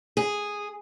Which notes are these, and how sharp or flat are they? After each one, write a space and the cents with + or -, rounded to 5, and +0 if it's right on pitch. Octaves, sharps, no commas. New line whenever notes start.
G#4 -5